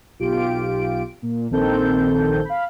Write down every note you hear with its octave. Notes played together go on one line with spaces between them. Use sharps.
B1 F4 G4 D7
A#2
A#1 D#3 C4 A4 G6
F5 B5